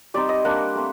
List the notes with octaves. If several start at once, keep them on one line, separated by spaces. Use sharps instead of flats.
G3 C4 D#4 D5
D#5
G3 A#3 D4 F#5
A3 C4